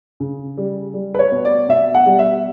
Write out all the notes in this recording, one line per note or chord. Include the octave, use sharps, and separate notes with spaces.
C#3
G3
G3
B4
C#5
B2
D5
B2 E5
F#5
G3
E5